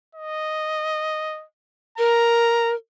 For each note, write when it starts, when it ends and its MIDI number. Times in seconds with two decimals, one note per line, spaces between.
0.15 1.45 75
1.98 2.75 70
1.98 2.73 82